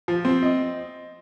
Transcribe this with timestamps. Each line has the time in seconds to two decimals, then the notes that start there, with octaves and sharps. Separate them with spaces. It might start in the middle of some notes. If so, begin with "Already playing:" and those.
0.08 F3
0.25 C4
0.43 D#5